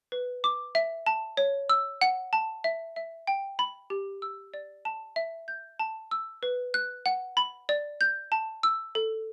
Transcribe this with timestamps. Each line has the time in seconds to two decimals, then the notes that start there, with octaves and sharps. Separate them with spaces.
0.12 B4
0.44 D6
0.75 E5
1.06 A5
1.37 C#5
1.69 E6
2.01 F#5
2.33 A5
2.64 E5
2.96 E5
3.27 G5
3.59 B5
3.90 G4
4.22 E6
4.54 D5
4.85 A5
5.16 E5
5.48 G6
5.79 A5
6.11 E6
6.43 B4
6.74 F#6
7.06 F#5
7.37 B5
7.69 D5
8.01 G6
8.32 A5
8.63 E6
8.95 A4